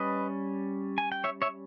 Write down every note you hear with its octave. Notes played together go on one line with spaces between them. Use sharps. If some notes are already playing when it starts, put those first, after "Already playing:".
Already playing: G3 C#4 B4 D#5
G#5
G5
C#5 E5
C#5 E5